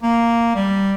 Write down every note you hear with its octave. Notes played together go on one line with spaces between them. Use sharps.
A#3
G3